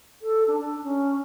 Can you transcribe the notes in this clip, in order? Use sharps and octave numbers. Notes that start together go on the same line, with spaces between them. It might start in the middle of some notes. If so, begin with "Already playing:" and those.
A4
D4
D4
C#4